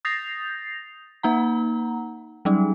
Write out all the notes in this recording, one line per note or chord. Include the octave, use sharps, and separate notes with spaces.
D#6 G6 A6 A#6 C7 F7
A#3 D#4 F#5 A#5
F#3 G3 C#4 D#4